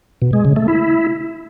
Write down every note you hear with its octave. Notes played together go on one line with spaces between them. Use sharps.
B2
G#3
C#3
A3
E4